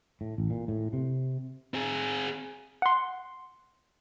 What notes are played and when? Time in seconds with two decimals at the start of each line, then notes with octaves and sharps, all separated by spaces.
0.21 A2
0.38 A1
0.50 A#2
0.68 A2
0.93 C3
1.74 C4 G#4
2.82 F#5 C6